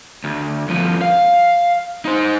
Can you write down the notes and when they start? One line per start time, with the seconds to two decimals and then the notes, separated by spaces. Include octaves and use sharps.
0.24 D2
0.68 G2 F3
1.01 F5
2.05 D#4 C5